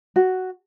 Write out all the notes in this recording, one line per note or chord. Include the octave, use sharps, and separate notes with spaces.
F#4